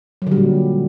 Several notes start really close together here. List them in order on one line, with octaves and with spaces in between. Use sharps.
F#3 D3 G3 A#2